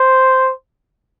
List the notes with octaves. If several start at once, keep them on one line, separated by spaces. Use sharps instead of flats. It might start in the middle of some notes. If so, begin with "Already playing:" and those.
Already playing: C5